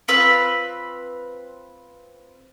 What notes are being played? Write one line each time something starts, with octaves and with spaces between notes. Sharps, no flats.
C4 F4 B4 E6